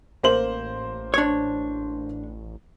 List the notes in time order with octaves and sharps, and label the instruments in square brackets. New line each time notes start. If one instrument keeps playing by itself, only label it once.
[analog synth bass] A1 [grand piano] A#3 C5 F#7
[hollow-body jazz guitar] D4 C#5